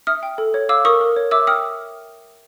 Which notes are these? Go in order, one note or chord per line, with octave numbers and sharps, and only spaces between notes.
E5 D#6 F6
G5
A4
C#5
F5 D6 E6
A#4 C#6 D#6
A#4
C#5
E5 D6 E6
G5 D#6 F6